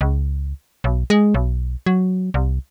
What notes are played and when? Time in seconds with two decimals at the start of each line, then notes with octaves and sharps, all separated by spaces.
0.01 C#2
0.84 B1
1.10 G#3
1.34 B1
1.86 F#3
2.34 C2